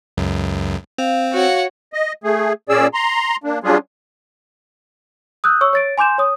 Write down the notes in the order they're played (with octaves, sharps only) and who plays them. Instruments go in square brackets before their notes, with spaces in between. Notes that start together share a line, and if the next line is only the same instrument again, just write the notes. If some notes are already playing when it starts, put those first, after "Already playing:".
[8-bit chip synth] C#2 F#2
[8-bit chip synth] C4 [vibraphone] F5
[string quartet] F#4 C#5 F#5
[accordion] D#5
A3 G#4
A#2 C#4 G#4 D5 E6
A#5 C6
A#3 D4
F#3 G3 C#4 D4 F4 G#4
[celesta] D#6 E6 F#6 G6
C#5 C#6 E6
C#5 A6 D7
G#5 C6 D6 G6 E7
C#5 D#6